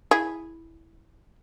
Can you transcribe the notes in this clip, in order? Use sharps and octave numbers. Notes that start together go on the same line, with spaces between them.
E4 G#4